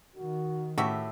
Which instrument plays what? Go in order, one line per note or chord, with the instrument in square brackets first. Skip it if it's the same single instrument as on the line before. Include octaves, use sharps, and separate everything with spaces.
[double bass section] D#3 [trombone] F#4
[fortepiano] A2 [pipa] F#4 G4 E5